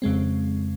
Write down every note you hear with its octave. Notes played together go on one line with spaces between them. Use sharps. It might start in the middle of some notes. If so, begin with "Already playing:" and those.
F2 C#3 G#3 C4